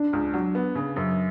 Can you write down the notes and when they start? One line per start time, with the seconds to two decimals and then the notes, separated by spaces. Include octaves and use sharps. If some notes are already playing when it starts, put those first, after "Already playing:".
Already playing: D4
0.13 C#2
0.34 F#3
0.55 B3
0.75 C#3
0.96 F#2